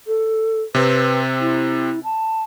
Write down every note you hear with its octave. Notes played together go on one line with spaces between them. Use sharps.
A4
C3 C4 B4
E4
A5